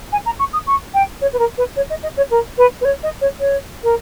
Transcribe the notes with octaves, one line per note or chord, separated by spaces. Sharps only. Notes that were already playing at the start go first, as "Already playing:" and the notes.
G#5
A#5
C#6
D#6
C#6
G5
C#5
B4
A#4
B4
C#5
D#5
D#5
C#5
A#4
B4
B4
C#5
D#5
C#5
C#5
A#4